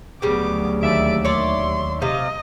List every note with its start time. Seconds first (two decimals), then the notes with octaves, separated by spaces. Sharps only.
0.22 D2 C#3 F#3 G3 B3 D6
0.83 D#2 D5 E5 D7
1.25 C#5 D5 C6
2.02 C3 D#5 F5